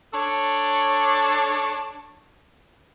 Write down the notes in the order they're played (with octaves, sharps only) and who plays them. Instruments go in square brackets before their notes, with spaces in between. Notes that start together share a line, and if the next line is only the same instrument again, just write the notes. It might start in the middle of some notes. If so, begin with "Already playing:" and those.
[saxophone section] D4 A4 C#5